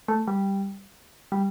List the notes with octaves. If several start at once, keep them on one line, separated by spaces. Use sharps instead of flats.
A3
G3
G3